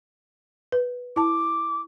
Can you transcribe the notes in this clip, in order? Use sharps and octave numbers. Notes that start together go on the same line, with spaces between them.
B4
E4 A5 D6